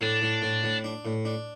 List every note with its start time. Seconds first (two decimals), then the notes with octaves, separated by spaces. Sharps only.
0.01 A2 D4
0.22 A2
0.42 A2
0.63 A2
0.84 D4
1.05 A2
1.25 D4